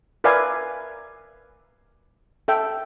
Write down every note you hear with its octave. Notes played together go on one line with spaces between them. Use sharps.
A#4 B4 D5 E5 F5 G#5
A4 E5 G5